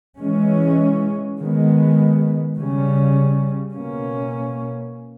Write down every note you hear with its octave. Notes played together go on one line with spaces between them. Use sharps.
E3 G#3 C#4
D#3 G#3 B3
C#3 G3 C#4
B2 A#3 C#4